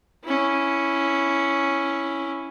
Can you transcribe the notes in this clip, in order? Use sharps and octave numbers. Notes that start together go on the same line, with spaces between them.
C#4 E4